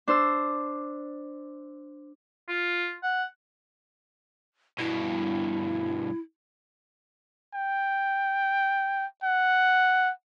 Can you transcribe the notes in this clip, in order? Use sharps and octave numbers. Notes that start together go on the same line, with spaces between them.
D4 C5 E6
F4
F#5
G2 B2 E4
G5
F#5